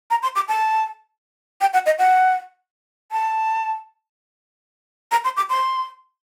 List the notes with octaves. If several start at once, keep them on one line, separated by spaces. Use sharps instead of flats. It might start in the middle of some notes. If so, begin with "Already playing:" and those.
A#5
C6
D6
A5
G5
F#5
D#5
F#5
A5
A#5
C6
D6
C6